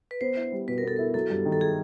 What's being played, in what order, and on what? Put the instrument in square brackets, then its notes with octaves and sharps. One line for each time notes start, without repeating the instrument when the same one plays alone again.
[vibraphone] B4
[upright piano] B3 [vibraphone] C5
[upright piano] E4
G3
[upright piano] B2 [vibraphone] B4
[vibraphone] A#4
[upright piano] B3 [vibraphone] A4
[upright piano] E4 [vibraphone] A#4
[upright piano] F#3 [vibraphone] A4
[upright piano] G2
D#3
[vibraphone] A4
G#4